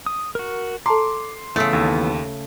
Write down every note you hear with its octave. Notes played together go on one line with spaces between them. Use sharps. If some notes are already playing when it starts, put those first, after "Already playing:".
D#6
F#4 A#4
A4 A5 A#5 C6 D6
C#3 E3 A3 B3 E6
D#2